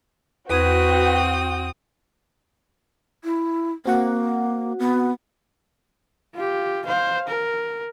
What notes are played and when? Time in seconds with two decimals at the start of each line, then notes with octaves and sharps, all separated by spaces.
0.50 E2 C4 F#4 B4 G5 D#6 G#6
3.24 E4
3.86 A#3 C4 F#4 F#5
4.79 B3
6.35 F4 G4
6.86 C5 F5
7.29 A#4